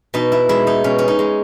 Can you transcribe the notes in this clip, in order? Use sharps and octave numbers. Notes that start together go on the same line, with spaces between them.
B2 D#4
E4
G#3 E4
D#4
B2 C#4
C#4
D#4
G#3